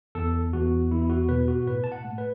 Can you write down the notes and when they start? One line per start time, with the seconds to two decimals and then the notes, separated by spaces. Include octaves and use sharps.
0.15 E2 A4
0.53 E2 F#4
0.91 E2 E4
1.02 E4
1.10 F#4
1.29 B2 B4
1.48 F#4
1.66 A2 B4
1.84 A5
1.92 F#5
2.04 A3
2.18 B4